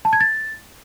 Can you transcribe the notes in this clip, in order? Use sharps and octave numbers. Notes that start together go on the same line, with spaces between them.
A5
G#6
A6